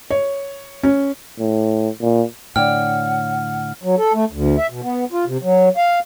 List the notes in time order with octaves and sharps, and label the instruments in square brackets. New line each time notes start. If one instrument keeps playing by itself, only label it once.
[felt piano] C#5
C#4
[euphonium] A2
A#2
[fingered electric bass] A2 D3 [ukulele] D4 C#5 G5 [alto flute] F#5 [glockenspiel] F6
[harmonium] F#3
A4
A3
D2
E5
B2
B3
F4
C3
F#3
F5